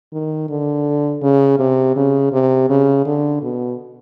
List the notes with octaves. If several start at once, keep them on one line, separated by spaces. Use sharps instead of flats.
D#3
D3
C#3
C3
C#3
C3
C#3
D3
B2